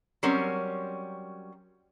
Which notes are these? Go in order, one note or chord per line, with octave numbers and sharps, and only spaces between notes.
F#3 G3 C4 C#4 A#4